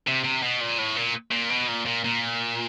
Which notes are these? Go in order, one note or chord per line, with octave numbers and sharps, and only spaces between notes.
C3
C3
B2
A#2
A2
A#2
A#2
B2
A#2
A#2
A#2